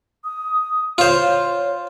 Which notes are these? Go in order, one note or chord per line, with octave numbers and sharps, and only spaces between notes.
D#6
F4 C5 C#5